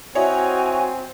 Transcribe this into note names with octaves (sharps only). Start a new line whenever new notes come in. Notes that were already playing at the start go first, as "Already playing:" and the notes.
C4 E4 F#4 C#5 D#5 G#5